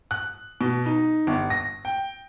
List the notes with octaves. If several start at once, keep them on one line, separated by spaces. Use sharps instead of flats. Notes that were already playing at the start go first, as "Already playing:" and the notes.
F#6
B2
D#4
G1
A#6
G5